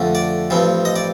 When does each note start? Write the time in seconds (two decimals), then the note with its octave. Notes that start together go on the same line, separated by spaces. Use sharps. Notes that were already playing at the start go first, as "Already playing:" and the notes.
Already playing: F2 D3 A3
0.15 D5
0.50 A1 G2 F3 C4
0.85 D#5
0.96 D5